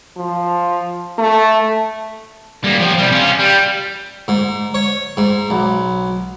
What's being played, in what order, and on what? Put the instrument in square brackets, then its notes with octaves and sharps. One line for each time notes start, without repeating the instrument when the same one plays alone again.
[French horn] F3
A3
[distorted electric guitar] G3 A#3
F3 G4
C3 G3
C#4 F4
G3
[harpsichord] G#2
C#5
G#2
B1